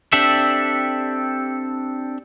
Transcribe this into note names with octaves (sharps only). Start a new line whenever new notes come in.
C4 D4 G4 A4 E5